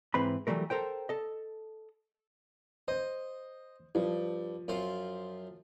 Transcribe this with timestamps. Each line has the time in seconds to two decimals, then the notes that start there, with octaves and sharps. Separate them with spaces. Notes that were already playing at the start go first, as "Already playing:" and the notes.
0.14 G#2 E3 C4 B4 B5
0.47 E3 F#3 G3 A3 A#4
0.70 A4 A#4 C5 G5
1.09 A4 D#5
2.88 C5 D#5
3.95 G2 F3
4.68 F#2 F4 C5